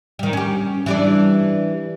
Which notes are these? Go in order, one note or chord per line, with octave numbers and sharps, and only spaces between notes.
D#3 G3
C#4 G4
E3 G3 D4